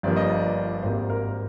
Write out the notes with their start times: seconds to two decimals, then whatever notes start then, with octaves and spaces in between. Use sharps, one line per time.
0.03 G1 G2 F3 A#3 D5
0.16 D#5
0.30 D5
0.83 G#1 G#2 G3 A#3 C5
1.10 A#4